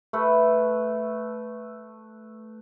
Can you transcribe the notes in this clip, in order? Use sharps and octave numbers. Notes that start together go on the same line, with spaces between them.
A3 A4 B4